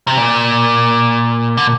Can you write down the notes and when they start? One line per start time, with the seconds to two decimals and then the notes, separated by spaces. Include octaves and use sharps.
0.07 C3
0.18 A#2
1.57 D3